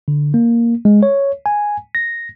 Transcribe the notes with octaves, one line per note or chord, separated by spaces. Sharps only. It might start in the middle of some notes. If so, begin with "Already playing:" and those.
D3
A#3
G#3
C#5
G#5
A#6